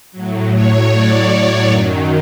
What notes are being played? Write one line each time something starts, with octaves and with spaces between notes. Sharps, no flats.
A2 F#3
C#5
D5
F#2 D#3 F#3